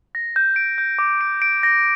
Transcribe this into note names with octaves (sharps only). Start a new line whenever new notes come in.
A#6
G6
D7
G6
D6
D7
D7
A#6